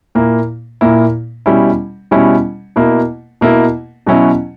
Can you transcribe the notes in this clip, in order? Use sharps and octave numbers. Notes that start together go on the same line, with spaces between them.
A#2 A#3 E4
A#2 A#3 E4
B2 G3 C#4 E4
B2 G3 C#4 E4
B2 A#3 E4
B2 A#3 E4
B2 F#3 C#4 E4